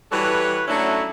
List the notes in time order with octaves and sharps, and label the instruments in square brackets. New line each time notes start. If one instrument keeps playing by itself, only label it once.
[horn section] E3 G3 F#4 A4 B4 C#5
F#3 A3 C#4 D4 E4 F#4